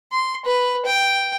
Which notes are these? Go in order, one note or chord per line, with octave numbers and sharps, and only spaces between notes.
C6
B4
G5